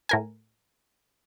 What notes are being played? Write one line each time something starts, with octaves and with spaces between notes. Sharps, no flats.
A2 A#4 G#5